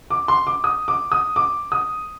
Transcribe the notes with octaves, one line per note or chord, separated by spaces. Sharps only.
D6
C6
D6
D#6
D6
D#6
D6
D#6